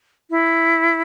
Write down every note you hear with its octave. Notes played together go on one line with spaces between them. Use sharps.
E4